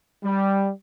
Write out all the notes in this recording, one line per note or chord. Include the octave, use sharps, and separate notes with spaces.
G3